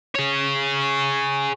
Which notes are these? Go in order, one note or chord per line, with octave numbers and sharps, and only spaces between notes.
G#4 C#5